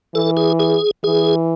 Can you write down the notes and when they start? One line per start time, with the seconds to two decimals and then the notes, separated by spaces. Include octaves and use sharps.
0.14 E3 A4
0.37 G#4
0.59 G#4
1.04 E3 G#4